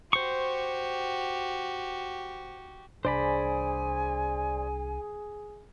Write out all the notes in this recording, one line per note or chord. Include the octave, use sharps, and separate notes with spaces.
F#4 G4 C5 C#6
C2 D4 G#4 C5 D5 G#5 B5